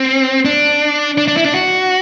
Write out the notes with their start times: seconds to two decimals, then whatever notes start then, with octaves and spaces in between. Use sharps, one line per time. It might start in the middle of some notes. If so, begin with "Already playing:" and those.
Already playing: C4
0.45 D4
1.18 D4
1.28 D4
1.37 E4
1.45 D4
1.54 F#4